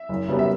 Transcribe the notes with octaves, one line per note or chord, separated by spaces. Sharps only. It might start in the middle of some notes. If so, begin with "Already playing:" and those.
Already playing: E5
F#1
F#2 C#3 G3 B3
E5